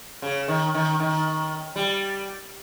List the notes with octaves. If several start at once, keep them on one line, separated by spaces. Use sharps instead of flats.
C#3
D#3
D#3
D#3
G3